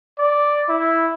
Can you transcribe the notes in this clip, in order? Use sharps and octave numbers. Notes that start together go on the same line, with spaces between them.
D5
E4